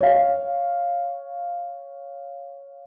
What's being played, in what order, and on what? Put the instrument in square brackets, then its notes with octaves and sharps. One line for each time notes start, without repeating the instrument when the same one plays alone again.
[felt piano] C#5 F5